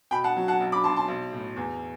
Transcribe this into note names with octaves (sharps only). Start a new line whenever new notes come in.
B2 G5 B5
F#5 A5
F#3
F#5 A5
B1
B5 D6
B1 A5 C6
A5 C6
B1
A2
E2